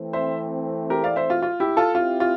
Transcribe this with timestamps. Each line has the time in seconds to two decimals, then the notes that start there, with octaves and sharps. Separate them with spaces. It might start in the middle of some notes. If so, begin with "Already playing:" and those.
Already playing: E3 A3 C4
0.13 C5 E5
0.90 G4 A#4
1.04 D5 F5
1.16 C5 E5
1.30 F4
1.42 F4
1.60 E4 G4
1.77 F4 A4
1.95 C4 E4 F4 G4
2.20 F4